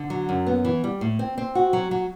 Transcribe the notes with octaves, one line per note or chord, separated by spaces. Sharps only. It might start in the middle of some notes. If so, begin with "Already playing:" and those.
Already playing: D3
F#3
F#2
B3
E3
G3
A2
C4
C4
F#4
F#3
F#3